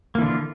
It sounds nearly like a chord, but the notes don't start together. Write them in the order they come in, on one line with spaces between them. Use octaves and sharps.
A#3 E3 D3 F4